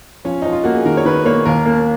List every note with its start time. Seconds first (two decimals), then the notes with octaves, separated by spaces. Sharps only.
0.25 F3 C#4
0.42 F3 D#4
0.52 F4
0.64 A#3 F#4
0.75 G#4
0.85 D#3 A#4
0.97 C#5
1.05 D#3 B4
1.25 A#3 C#5
1.45 D#2 A#4
1.66 A#3